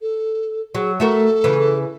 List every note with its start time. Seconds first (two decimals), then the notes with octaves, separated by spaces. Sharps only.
0.01 A4
0.75 F#3 G#4
1.00 A3 F#4 A4 A#4
1.44 C#3 E3